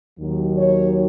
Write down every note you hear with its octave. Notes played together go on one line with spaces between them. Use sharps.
D#2 D#3 F#3
C#5